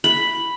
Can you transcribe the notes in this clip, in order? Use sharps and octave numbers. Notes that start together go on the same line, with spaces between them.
B5